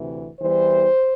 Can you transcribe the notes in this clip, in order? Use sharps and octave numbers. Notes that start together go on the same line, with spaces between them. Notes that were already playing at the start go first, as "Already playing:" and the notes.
Already playing: D2 C3 E3
E2 E3 G3 C5